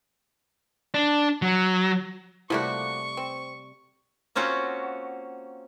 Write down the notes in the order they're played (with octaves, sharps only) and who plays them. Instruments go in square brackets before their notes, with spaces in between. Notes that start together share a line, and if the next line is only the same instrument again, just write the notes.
[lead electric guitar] D4
F#3
[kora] C3 G3 A3 [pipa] F3 A#3 F#4 [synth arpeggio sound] E4 [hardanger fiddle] C#6
[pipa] C4
[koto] A#3 C4 C#4 F4 F#4